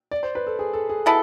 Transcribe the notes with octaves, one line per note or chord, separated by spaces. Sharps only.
D5
C5
B4
A4
G#4
A4
G#4
B2 B3 E4 A4